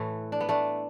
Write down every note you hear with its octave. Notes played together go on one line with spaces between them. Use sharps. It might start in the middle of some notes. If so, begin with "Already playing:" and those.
Already playing: A2 E3 A3
D4
B3
A3 D4